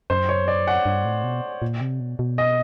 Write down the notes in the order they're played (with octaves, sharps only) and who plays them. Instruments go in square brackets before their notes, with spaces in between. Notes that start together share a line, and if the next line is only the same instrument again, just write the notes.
[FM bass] F#2 [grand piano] C5
[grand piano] C#5
D5
F#5
[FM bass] G2
A2
B2
A#2
C3
B2
B2
[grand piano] D#5